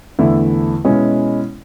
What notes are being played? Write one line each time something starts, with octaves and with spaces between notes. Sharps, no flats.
E2 D3 A3 E4
B2 G#3 C#4 E4